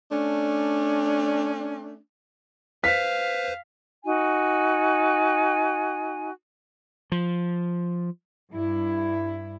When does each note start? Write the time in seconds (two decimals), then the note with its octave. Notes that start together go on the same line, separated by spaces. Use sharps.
0.12 A3 C#4 D4
2.84 B4 C5 F5 B6
4.05 D#4 F#4 G#5
7.12 F3
8.51 G2 E4